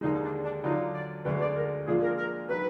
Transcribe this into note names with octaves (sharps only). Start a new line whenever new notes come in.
D#2 D3 G#3 D#4
D4
D4
D3 F#3 D4 D#4 F4
D5
D2 D3 G#3 D4 B4
D5
A#4
A#2 F3 G#3 D4 F4 G#4
A#4
A#4
D#3 F#3 B4